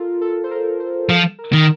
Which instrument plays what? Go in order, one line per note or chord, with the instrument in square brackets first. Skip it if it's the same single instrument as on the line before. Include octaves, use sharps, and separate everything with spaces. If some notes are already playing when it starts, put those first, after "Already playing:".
Already playing: [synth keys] F4 A4 A#4
A4
C5
A#4
C5
[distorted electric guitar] F3 [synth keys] A4
[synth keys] A#4
[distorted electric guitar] D#3